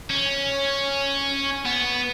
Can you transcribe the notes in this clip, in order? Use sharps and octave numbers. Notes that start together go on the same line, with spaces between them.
C#4
B3